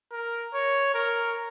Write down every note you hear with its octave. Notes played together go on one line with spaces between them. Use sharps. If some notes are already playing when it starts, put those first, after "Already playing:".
A#4
C#5
A#4